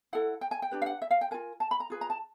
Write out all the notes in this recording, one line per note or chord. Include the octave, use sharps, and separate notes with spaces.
E4 A4 F#5
G5
G#5
G5
D4 G4 B4
F5
F#5
E5
F5
G5
F4 A#4 G#5
A5
B5
A#5
F4 G#4 B4
A#5
A5